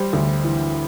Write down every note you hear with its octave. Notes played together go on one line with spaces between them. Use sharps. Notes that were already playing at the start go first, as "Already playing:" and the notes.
Already playing: G3 C5
D2
E3